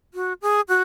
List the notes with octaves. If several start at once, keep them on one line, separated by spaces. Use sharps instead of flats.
F#4
G#4
F#4